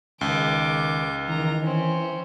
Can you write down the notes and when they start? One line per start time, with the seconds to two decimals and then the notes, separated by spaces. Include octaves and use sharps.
0.21 C#2 D#3 D6
1.28 D#3 E3 A#5
1.63 C4 C#4